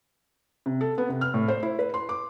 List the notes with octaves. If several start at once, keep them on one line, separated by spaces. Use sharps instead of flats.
C3
A4
B3
C3
F6
A2
C5
E4
B4
C6
D6